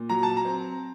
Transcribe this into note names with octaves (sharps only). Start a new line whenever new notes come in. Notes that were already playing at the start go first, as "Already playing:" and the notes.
Already playing: A#2
F#3 A#5
A5
A#5
C4